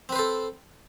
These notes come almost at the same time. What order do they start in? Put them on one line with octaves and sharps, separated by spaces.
C4 B4 C5 A4